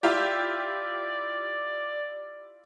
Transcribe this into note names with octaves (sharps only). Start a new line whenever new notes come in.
E4 F4 G4 D5